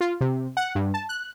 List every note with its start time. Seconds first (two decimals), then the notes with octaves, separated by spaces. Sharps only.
0.01 F4
0.21 C3
0.57 F#5
0.75 G2
0.94 A5
1.09 F#6